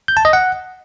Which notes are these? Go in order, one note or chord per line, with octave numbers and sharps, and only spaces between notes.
G6
A5
D#5
F#5